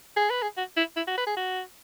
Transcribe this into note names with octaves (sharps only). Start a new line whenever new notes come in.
G#4
B4
G#4
F#4
E4
E4
F#4
B4
G#4
F#4